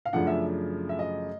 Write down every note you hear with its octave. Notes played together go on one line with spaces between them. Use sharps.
F5
F#2 C#3 F3 A3 D4 F#5
E5
E5
D#5